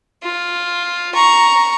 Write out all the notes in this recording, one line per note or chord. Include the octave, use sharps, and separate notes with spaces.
F4
A#5 C#6